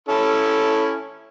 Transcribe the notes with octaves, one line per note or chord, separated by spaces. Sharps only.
C#4 E4 A4